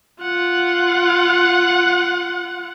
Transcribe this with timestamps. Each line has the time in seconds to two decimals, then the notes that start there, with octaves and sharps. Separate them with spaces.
0.22 F4 F#5